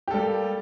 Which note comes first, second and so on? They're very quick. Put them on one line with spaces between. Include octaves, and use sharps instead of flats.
G4 A4 G3 A#3